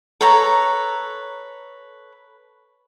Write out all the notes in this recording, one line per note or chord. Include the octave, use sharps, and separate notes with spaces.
A4 B4 C#5 A#5